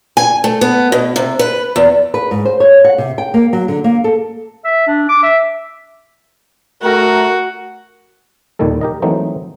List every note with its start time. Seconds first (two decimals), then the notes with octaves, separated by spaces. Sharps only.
0.17 G#5
0.44 A3
0.61 B3
0.92 B2
1.16 C3
1.39 B4
1.76 E2
2.14 B4
2.31 G#2
2.45 C5
2.60 C#5
2.84 F#5
2.98 C3
3.18 G5
3.34 A#3
3.53 F#3
3.68 D3
3.84 A#3
4.04 A4
4.64 E5
4.87 D4
5.09 D6
5.23 E5
6.82 A3 F#4 A#4
8.59 D#2 A#2 D#3 G3 A4
8.81 G4 A#4 D#5
9.02 E3 F#3 A3 A#3 C4 D#4